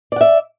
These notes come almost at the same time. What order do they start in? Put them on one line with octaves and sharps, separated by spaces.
D5 F#5 E5